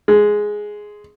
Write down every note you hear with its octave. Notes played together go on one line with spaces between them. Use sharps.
G#3